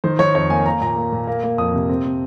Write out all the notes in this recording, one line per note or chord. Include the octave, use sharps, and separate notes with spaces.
D#3 C5
D#3 C#5
F2 C#5
A#3 G#5
A#3 A#5
A#2 A#5
A#3
A#2
A#3
A#3
F2 D#6
C3
C4
C4